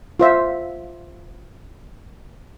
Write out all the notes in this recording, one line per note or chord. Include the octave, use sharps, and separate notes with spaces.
F4 C5 E5